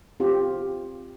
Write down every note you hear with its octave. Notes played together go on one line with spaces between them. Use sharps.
C4 F4 G4